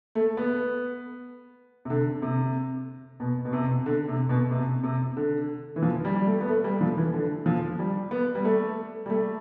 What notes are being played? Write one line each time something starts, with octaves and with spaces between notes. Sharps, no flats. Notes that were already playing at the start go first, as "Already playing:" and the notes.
A3
B3
C3
D3
C3
B2
B2
C3
D3
C3
B2
C3
C3
D3
E3
F3
G3
G3
A3
B3
A3
G3
F3
E3
D3
F3
G3
B3
G3
A3
G3
A3